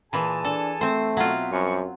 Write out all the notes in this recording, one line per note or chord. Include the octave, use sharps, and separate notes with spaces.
A#2 E3 G#4 G#5 A5
D4 A4
A3 C4 C5
B2 F#3 B3 F4 E5
C2 F#2 F3 C#6